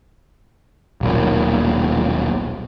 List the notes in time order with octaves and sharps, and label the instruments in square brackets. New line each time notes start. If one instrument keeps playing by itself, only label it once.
[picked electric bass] D#1 B1 A#2